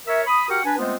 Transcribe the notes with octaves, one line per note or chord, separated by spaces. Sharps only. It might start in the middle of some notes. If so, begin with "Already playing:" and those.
A#4 C#5 E5
B5 D#6
F#4 G4 A#4 F#5 G5 F6
D4 B4 G#5
G#3 A3 B3 C4 F4 C5